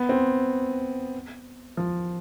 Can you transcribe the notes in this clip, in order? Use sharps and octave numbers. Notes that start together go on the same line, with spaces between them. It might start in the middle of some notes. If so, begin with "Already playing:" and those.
Already playing: B3
C4
F3